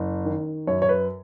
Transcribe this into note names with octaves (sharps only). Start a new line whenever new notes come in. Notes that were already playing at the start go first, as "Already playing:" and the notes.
Already playing: F#1
D#3
F#2 C#5
C#5
B4